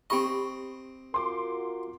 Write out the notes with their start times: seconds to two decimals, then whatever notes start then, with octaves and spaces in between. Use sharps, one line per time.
0.10 C4 G4 D#5 B5 C#6
1.14 F4 F#4 A#4 C6 D6